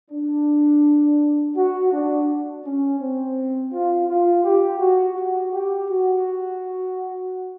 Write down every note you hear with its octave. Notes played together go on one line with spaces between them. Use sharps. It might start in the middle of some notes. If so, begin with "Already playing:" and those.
D4
F#4
D4
C#4
C4
F4
F4
G4
F#4
F#4
G4
F#4